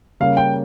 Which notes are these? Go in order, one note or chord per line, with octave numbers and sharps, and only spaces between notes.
C#3 G3 A#3 C#4 F5
G5